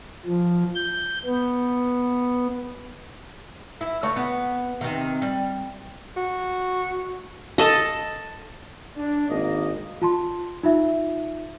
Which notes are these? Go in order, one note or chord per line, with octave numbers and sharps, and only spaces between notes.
F3
G6
B3
E4
C#3 A3 C#5
B3
C3 D#3
G3
F#4
A4 D#5 A5
D4
G#1 A#3 D#5
F4 A5 C6
D#4 F4 E5